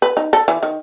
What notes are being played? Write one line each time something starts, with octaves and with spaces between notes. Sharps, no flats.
B4
D#4
A4
E3
D#3